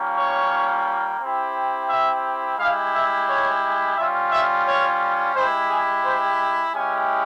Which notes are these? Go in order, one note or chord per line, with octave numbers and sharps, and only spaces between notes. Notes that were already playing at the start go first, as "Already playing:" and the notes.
Already playing: G3 A#3 C#4 F4
C#5
C4 E4 G4
E5
G#3 E4 G4 F5
E5
C#5
G3 C#4 F4 E5
E5
C#5
G#3 E4 G4 C5
G#4
C5
G#3 C#4 E4 G4 G#5